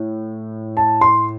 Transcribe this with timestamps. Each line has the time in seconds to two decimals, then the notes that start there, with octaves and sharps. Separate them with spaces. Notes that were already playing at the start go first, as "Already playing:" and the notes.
Already playing: A2
0.77 A5
1.01 C6